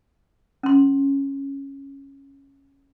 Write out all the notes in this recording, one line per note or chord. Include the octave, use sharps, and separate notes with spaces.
C#4 C6